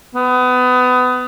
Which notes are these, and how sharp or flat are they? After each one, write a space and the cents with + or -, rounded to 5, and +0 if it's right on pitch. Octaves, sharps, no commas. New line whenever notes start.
B3 +25